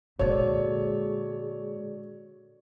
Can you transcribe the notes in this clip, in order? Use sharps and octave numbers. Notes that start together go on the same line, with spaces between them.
A#2 D3 G#3 F#4 A4 C#5 D5